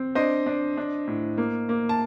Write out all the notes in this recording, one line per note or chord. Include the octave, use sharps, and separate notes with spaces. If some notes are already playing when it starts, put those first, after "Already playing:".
Already playing: C4
D4 C5 D#5
D4
D4
A2
A#3
A#3
A5